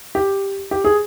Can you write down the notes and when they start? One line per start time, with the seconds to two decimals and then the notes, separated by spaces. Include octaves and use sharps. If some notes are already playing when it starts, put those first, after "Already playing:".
0.15 G4
0.71 G4
0.85 G#4